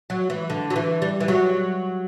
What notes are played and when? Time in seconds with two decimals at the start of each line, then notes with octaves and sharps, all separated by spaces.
0.10 F#3
0.30 E3
0.50 D3
0.70 F#3
0.76 E3
1.02 G3
1.20 E3
1.28 F#3